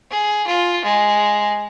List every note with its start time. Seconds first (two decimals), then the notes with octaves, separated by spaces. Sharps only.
0.11 G#4
0.47 F4
0.84 G#3